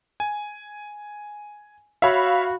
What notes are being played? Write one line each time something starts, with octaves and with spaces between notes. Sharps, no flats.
G#5
F#4 C#5 E5 F5 B5